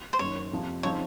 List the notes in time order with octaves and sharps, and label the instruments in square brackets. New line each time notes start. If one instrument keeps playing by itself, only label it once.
[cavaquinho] C5
[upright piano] F#1 F#2 D#3 [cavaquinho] C#5
[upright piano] F#1 F2 C3 F3
[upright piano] C#3 F3 C4 D#4 [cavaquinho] C#5